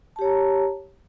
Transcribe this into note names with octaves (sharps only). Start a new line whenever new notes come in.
G4 C#5 A5 A#5